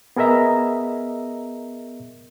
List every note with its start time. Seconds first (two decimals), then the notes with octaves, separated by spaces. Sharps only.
0.16 B3 G#4 A#4 D#5 E5 A#5